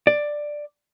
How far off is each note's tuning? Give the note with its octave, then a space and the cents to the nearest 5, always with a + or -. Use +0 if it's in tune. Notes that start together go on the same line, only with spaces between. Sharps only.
D5 +10